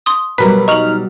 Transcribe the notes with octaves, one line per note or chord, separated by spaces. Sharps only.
C6 D#6
B2 F#3 G3 A#4 B4 B6
D#4 C#6 F6 F#7